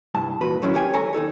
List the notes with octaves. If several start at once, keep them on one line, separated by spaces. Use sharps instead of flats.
C2 G2 A5
E2 A#2 F#4 B4
D3 D#3 F#3 C#4 D4 E4
G4 A#4 C#5 G5 G#5
A4 C#5 G#5 A#5
D#2 D#4 A4 C#5